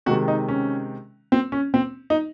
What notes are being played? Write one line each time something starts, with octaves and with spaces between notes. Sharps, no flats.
C3 D#3 G#3 F#4
D#4
C#4
C4
C#4
C4
D#4